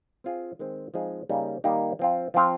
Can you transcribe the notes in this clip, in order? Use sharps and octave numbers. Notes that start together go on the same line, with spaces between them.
C4 F4 G#4
D#3 G#3 C4
F3 G#3 C4 D#4 G#4
C#3 G3 A#3 D#4
D#3 G3 A#3 D#4 G4
F3 C4 F4
F3 C4 F4